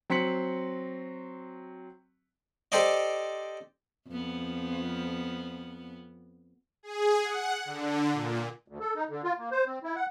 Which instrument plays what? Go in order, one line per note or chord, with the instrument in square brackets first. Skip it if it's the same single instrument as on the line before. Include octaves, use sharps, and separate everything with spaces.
[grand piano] F#3 C4 C6 B6 C#7 F#7
[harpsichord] G4 A4 C5 D5 D#5
[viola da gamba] F2 B3
[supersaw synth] G#4
F#5
D3
A#2
[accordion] D2
A4
D#4
D3
F4
A#3
C5
C4
E4
F#5